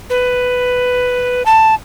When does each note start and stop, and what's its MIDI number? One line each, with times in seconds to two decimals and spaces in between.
0.10 1.43 71
1.46 1.75 81